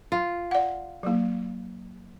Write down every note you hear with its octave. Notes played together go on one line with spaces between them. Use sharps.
F4
D5 F#5
F#3 A#3